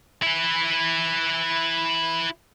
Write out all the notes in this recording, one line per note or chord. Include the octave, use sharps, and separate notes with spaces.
E4 B4